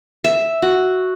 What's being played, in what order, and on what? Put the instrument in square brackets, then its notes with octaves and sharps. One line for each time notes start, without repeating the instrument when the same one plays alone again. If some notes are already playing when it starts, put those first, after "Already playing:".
[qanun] E5
F#4